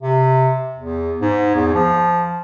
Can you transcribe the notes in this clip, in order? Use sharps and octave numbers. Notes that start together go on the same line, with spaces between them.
C3
E2
G#2
E2
F3